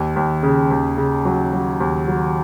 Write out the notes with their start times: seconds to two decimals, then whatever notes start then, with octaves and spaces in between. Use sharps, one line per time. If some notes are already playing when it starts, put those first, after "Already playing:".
Already playing: D#2
0.16 D#2
0.43 C#3
0.71 D#2
0.97 C#3
1.25 F#3
1.53 F#3
1.80 D#2
2.07 F#3